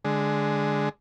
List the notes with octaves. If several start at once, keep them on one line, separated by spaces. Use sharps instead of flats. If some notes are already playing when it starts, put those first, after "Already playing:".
D3 G#3